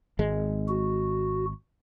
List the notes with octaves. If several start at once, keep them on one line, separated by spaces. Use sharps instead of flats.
G#1 G#3
F#4